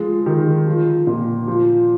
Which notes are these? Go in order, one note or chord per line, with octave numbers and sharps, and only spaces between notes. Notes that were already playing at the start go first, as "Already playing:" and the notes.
Already playing: F3 G#3
D#3
F3
A#2
F3